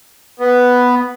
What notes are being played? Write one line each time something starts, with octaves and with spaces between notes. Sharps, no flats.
B3